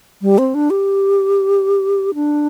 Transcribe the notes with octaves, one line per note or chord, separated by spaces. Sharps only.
G3
C4
D4
G4
D4